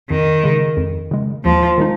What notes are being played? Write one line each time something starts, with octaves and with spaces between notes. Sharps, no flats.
F2 D#3
C#3 G#3
F2
C#3 G#3
D#2 F3
D#3 G#3 D#4